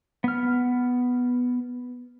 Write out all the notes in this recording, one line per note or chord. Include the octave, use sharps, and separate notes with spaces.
B3 F6